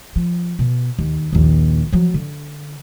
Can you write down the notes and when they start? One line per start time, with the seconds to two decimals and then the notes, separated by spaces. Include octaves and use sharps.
0.16 F3
0.59 B2
0.99 D#2
1.33 A#1 D#2
1.93 F3 F#3
2.14 D3